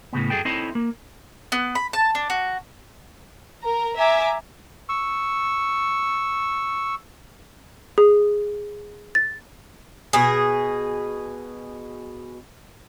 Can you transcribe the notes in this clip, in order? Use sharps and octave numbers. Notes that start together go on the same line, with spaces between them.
A2 C#3 B3
F#2 F#3 E4 G#4 A4 G5
C4 D#4 E4 A4 C5 C#5
A#3
B3
B5
A5
D4
F#4
A#4 A#5
E5 G#5 A#5 D6
C#6 E6
G#4
A6
B2 G#4